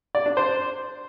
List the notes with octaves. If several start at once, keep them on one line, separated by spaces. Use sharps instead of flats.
D5
D4
C5